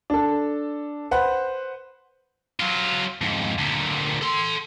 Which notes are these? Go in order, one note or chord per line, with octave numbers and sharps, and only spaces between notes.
D4 A4
B4 C5 F#5
F#3 F4
F2 G#2
D2 A#2
A4 C6